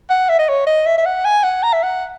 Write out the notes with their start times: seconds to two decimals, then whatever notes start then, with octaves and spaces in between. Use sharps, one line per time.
0.10 F#5
0.29 E5
0.39 D#5
0.49 C#5
0.67 D#5
0.86 E5
0.98 E5
1.06 F#5
1.25 G#5
1.43 F#5
1.63 A#5
1.73 E5
1.83 F#5